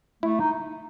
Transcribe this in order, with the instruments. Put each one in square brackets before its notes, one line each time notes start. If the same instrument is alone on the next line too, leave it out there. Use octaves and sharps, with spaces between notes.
[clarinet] A3 [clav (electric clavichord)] E4
[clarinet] D#4